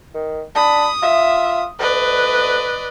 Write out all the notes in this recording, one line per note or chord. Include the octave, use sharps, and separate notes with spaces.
D#3
D4 B5 D#6
F4 E5
D2 B4 D5 D#5